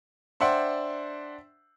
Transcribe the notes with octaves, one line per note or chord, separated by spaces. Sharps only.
D4 C5 E5 F#5 G5 C6